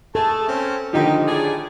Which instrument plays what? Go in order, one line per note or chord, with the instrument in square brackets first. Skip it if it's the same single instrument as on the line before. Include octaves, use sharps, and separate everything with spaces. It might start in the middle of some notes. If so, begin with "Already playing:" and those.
[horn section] A3 G#4 A5 [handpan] A4
[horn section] C4 C#4
[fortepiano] D3 D#3 F3 [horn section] D#4 G4
[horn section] A2 G#4 D5